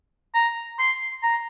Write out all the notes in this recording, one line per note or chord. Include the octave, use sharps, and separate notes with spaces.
A#5
C6
A#5